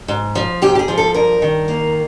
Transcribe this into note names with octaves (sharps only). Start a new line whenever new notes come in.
G#2
F3
G#2 G4
G4
G#4
F3
A4
G2 A#4
D#3
A#3